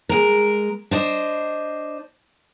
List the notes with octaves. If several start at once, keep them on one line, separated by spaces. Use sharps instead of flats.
G#3 A#4
D4 C5 D#5